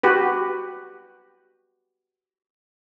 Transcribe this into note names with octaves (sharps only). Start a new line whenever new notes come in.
F#4 G4 B4